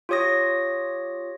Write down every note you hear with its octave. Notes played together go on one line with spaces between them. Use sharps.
F4 G4 C#5 D#6 A#6